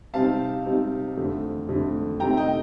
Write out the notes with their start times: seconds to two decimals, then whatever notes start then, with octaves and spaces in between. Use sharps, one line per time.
0.14 C3 G3 C4 D#4 F5 A5
0.65 C3 G3 C4 D#4
1.17 F2 D3 A3
1.69 F2 D3 A3
2.20 C3 D#3 A3 C4 G5 A#5
2.37 D#5 G5